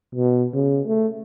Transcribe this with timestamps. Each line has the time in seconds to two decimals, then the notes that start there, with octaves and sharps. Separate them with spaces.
0.15 B2
0.53 C#3
0.87 A3